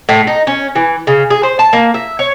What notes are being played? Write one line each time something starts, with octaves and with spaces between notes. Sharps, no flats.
A2
D#4
C#4
E3
C#3
G#4
C5
A5
A#3
E5
C#5